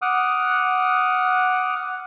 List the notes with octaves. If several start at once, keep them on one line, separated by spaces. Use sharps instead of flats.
F#5 D6 D#6 F6